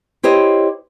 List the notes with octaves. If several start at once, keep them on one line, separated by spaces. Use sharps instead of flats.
E4 G4 C5 C#5 D#5